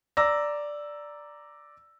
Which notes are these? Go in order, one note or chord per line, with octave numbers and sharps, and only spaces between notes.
D5 A#5 E6 A#6